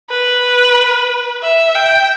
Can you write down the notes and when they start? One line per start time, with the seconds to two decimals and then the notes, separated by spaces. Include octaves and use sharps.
0.10 B4
1.42 E5
1.75 G5